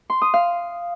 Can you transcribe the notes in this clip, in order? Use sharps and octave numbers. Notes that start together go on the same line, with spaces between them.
C6
D#6
F5